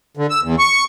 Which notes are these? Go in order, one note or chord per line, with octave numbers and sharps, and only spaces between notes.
D3
E6
E2
C#6